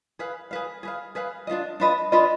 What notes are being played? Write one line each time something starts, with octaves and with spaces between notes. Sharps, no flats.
G#4 B4 F5
G#4 B4 F5
G#4 B4 F5
G#4 B4 F5
D4 F4 B4 D#5
D4 F4 B4 D#5
D4 F4 B4 D#5